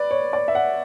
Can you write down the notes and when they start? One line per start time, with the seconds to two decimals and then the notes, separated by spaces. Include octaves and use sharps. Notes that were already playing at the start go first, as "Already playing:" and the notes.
Already playing: B4 D5
0.11 C#5
0.33 D5
0.48 E5
0.55 F#5